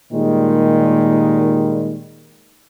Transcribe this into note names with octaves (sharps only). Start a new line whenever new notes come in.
A#2 D#3 G3 G#3